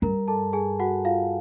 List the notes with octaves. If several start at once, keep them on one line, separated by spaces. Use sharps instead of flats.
G2 A#4 A#5
A4 A5
G#4 G#5
F#4 F#5
F4 F5